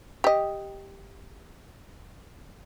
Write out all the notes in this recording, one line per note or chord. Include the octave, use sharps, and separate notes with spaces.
G4 D#5